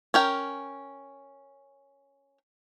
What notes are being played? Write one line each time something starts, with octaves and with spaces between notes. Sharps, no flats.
C#4 A#4 G5